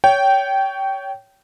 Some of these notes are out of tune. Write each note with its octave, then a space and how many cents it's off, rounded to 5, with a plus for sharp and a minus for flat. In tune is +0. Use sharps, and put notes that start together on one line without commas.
C#5 +20 G5 -15